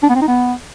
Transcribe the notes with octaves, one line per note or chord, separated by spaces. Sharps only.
D4
B3
C4
D#4
B3